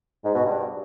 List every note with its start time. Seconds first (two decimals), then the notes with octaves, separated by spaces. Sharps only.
0.24 G#2
0.34 B2
0.44 G2